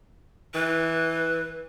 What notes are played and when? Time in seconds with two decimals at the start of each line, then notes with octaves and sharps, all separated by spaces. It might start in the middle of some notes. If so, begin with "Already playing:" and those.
0.55 E3 B4